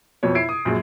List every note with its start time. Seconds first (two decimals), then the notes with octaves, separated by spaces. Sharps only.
0.23 F2 B2 C#5
0.35 E4 G#6 C7 D7
0.49 D#6
0.65 A#1 F#2 G#3